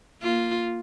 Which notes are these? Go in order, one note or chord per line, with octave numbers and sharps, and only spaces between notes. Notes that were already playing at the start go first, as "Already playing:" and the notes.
A#3 F4